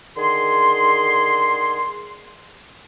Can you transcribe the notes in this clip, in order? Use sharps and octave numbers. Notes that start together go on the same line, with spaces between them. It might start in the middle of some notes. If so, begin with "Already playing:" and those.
D3 D#3 G#4 C6